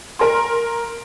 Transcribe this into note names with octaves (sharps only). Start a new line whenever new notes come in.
A#4 A#5 C6